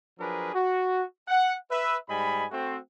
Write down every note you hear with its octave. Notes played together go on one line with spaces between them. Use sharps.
F3 F#3 D4 G#4 A#4 B4
F#4
F#5
B4 E5
G#2 G3 D#5 G#5 B5
A3 C4 F#4